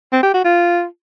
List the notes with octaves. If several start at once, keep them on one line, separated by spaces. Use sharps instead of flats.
C4
G4
F#4
F4